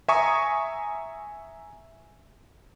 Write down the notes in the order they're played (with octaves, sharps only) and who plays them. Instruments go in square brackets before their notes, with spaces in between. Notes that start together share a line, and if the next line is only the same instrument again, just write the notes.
[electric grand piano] E5 G#5 A#5 C#6 D#6